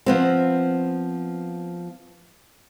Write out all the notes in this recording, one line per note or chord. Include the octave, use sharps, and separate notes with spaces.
F3 B3 C4